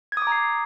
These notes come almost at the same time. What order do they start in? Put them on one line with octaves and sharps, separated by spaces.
G#6 D#6 D6 A#5 C7